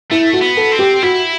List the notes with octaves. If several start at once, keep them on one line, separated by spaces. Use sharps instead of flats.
A3 E4
F#4
B3
A4
C4
G4
E4 F#4